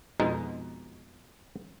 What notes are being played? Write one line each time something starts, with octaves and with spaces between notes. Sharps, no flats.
F2 B2 G#3 D#4